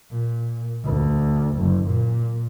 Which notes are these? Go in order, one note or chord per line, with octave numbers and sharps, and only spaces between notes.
A#2
D2
F#1
A#2